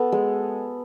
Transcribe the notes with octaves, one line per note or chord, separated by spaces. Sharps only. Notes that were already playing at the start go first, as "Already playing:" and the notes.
Already playing: B3 A4
G#3